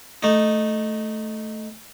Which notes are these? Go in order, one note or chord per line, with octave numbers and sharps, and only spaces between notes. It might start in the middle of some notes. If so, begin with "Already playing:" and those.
A3 D#4